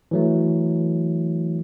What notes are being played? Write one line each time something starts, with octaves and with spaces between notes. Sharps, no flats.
E3 F#3 A3